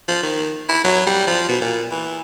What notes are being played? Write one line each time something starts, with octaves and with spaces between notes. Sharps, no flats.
F3
D#3
E4
F#3
G3
F3
B2
A#2
E3